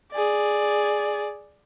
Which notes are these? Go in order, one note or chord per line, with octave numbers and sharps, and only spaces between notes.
G#4 D5